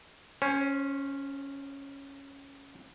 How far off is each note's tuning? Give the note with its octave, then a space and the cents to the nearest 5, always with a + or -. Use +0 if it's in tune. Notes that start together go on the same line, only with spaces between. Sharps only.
C#4 +0 C5 +35